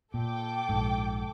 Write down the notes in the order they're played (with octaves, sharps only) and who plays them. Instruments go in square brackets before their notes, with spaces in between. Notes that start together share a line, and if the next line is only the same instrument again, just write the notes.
[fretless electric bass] A#2 [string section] A4 G5 D6
[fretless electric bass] A#1 G#2